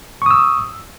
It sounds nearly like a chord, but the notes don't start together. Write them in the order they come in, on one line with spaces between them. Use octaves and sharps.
C#6 D#6 E6